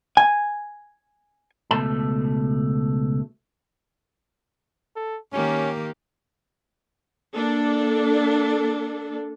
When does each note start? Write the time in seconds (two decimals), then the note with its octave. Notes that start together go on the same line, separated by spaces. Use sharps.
0.17 G#5
1.71 C#2 B2 A3 A5
4.96 A4
5.33 D#3 A#3 C#4 G4
7.35 A#3 D4 A4